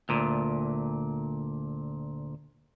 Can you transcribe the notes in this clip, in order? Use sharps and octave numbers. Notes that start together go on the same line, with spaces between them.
D2 A#2